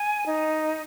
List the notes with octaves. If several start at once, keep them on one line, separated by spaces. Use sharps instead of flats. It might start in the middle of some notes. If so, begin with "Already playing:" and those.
Already playing: G#5
D#4